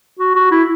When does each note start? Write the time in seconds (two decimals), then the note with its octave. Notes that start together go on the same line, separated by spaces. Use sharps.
0.19 F#4
0.35 F#4
0.51 E4